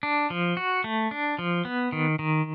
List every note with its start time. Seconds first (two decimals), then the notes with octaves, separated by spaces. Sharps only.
0.03 D4
0.30 F3
0.57 F#4
0.84 A3
1.11 D4
1.39 F3
1.65 B3
1.92 D#3
2.19 D#3